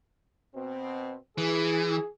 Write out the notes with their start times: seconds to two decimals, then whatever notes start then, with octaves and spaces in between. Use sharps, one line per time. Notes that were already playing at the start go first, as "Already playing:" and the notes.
0.54 B2 C4
1.38 E3 G#4